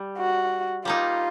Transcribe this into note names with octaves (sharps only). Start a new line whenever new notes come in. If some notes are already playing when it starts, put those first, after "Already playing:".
Already playing: G3
F#4
G3 A#3 D#4 F4